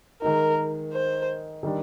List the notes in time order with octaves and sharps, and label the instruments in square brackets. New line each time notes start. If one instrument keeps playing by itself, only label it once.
[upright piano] D#3 G#3 D#4 [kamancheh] A#4
[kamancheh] C5
[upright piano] D#3 G3 D4